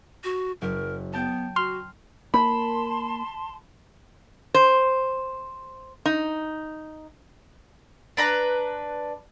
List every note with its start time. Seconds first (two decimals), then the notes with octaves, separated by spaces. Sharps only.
0.24 F#4
0.62 F#1 A#4
1.13 B3 G5 A5
1.56 F#4 C6 F6
2.34 A#3 A5 B5 C6
4.54 C5
6.06 D#4
8.17 D4 B4 A#5